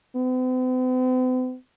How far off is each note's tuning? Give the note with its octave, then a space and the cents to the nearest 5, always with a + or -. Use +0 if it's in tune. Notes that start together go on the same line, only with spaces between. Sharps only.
C4 -45